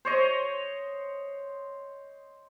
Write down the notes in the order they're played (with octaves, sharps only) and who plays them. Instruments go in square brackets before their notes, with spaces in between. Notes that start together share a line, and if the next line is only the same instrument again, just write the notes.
[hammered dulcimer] C5 C#5 D#5